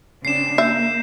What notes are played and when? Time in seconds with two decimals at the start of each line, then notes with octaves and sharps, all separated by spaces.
0.25 C#3 C4 D4 C7 E7
0.58 A#3 E5 G6